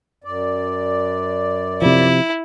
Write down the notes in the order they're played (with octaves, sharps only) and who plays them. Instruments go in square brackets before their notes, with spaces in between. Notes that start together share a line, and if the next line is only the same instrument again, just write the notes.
[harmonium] F#2 D5
[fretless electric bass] C3 F3 [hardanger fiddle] E4